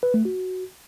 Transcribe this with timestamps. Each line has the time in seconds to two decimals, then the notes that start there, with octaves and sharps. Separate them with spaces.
0.03 B4
0.14 A3
0.25 F#4